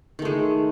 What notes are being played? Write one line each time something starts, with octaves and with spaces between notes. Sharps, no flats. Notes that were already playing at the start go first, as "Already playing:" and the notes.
D#3 G#3 A3